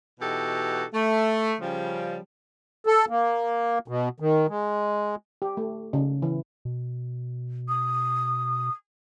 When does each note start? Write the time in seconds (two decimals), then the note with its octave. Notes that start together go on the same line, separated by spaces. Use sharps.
0.20 B2 E3 D#4 F#4 G4 A4
0.94 A3
1.60 C#3 F3 G3
2.87 A4
3.09 A#3
3.88 B2
4.20 D#3
4.49 G#3
5.42 G4
5.57 A3
5.93 C#3
6.22 E3
6.65 B2
7.68 D#6